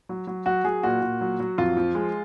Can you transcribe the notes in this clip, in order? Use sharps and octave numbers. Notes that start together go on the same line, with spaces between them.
F#3
F#3
F#3 F#4
F#3 G#4
A#2 F#4
A#2
F#3
F#3
F2 F4
F3
G#3